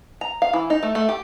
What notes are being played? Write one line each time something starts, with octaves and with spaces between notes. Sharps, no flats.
A#5
F5
E3
D#4
A3
A3
G4